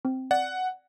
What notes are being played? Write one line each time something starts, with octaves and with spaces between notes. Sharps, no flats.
C4
D5 F#5